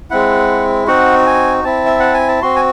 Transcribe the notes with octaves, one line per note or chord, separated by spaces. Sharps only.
G#3 C4 E4 F#5
C4 D#4 F#4 F#5
G#5
C4 E4 A5
E5
F#5
G#5
A5
C4 F#4 C6
G#5